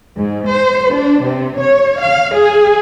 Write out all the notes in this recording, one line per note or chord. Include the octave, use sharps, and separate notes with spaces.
G#2
C5
D4
C3
C#5
F5
G#4